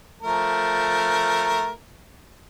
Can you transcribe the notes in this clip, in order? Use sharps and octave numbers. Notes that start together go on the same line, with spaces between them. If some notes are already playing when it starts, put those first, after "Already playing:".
F3 A3 A#4